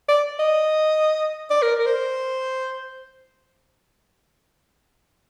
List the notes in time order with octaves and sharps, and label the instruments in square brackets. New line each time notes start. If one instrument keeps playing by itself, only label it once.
[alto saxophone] D5
D#5
D5
A#4
A#4
C5